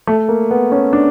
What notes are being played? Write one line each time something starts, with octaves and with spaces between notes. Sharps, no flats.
A3
A#3
B3
C#4
D4